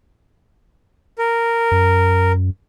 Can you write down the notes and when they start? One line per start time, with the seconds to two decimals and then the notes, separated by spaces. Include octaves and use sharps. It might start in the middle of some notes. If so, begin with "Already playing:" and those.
1.19 A#4
1.71 F#2